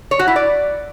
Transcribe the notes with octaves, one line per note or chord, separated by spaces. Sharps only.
C#5
F#4
E4
D5